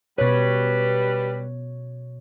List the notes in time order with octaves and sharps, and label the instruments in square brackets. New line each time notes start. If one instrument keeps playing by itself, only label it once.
[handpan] B2 C#5 [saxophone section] G3 B4